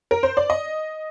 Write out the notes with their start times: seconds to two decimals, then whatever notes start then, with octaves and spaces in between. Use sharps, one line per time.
0.11 A#4
0.23 C5
0.37 D5
0.50 D#5